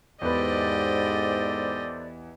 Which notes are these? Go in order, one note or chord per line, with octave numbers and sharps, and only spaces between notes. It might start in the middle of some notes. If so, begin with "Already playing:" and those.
E2 G#2 G4 A4 B4 C5 D5 D#5